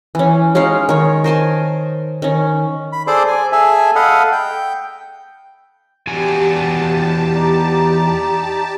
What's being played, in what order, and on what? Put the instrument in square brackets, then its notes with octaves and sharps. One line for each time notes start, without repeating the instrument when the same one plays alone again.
[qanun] E3 C#4
G#3 C#4 D#4 F5
D#3 C#5
A#4 C5 G#5 A5
D#3 C#4
[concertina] B5
G#4 A4 C5 D5 C6 D6
G#5
G#4 A4 E5 G#5
A4 D#5 F5 F#5 B5
G5
[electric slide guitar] E2 F#4 G#5 [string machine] G4 A5
[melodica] D#4 D5 A#5